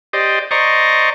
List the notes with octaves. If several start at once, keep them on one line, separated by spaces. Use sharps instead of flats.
G4 C5 D5 D#5
C5 D5 D#5 A#5 C#6